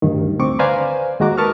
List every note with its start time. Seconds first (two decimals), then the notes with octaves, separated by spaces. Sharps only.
0.02 D2 G2 D#3
0.40 D2 C4 C#6 D6
0.59 B4 C5 D5 F5 G#5 A#5
1.20 D#2 G#3 F#4 A#5 D6
1.37 A#4 B4 A5 C#6 D#6 F6